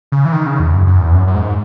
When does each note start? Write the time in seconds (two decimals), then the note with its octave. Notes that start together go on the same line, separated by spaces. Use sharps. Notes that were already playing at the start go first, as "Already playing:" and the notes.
0.12 C#3
0.25 E3
0.32 D#3
0.47 C#3
0.60 E2
0.73 F#2
0.87 F#2
1.01 E2
1.14 F#2
1.27 F#2
1.35 G#2